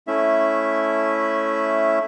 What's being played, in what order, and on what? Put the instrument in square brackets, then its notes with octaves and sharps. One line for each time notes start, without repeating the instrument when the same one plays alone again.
[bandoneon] A3 C#4 E4 E5